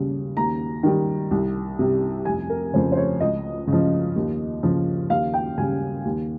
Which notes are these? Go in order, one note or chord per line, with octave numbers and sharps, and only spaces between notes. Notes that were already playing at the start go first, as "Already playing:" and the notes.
Already playing: D#2 C#3 G3
D#2 A#5
D#3 G3
C2
C3 G3
F1 G#5
A#4
F2 C#3 C5
C5
C#5
C#2 D#5
C#3
F3
D#2
C#3 F3
D#2 F5
G5
C#3 G3 G#5
D#2